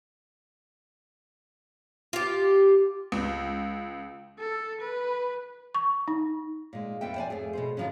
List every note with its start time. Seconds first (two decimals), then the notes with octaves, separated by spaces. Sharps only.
2.13 F4 G4
3.12 C#2
4.39 A4
4.81 B4
5.75 C#6
6.08 D#4
6.73 A#2 G#3
7.01 F2 G3 B3 B4 E5 G5
7.16 C5 D5 G#5
7.30 F2 A3 G#4
7.53 B2 G#4 C5
7.77 D3 D#3 F3 F#3 C#4